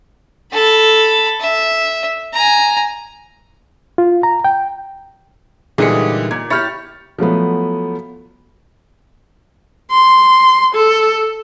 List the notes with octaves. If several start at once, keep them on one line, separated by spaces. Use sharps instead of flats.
A4 B5
E5
G#5 A#5
F4
A#5
G5
A#2 D3 E3 G3 G#3 D#4 G#4 C#7
A#2 G#6
E4 G4 C#5 B5 F6 A6 C#7
F3 F#3 A3 B3
C6
A4